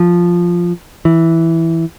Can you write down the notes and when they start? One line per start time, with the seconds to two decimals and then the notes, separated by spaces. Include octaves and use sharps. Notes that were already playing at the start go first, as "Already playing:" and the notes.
Already playing: F3
1.05 E3